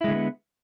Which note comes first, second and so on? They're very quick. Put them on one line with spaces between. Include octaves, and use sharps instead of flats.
E4 G#3 D3 A3 B3